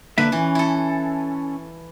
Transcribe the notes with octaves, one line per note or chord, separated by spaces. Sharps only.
D3 A#3 B4 E5
E3 C#4
E4 A4